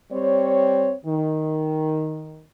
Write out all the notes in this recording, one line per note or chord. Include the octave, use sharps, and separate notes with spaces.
G3 C4 C#5
D#3